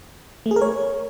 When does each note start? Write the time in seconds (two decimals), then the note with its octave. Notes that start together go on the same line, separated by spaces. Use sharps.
0.46 A3
0.51 G#4
0.56 A#4
0.61 C#5